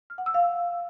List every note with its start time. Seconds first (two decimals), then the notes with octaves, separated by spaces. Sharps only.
0.10 F6
0.18 F#5
0.26 E6
0.34 F5